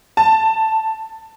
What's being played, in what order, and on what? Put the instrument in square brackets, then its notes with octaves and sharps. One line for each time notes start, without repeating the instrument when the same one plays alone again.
[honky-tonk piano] A5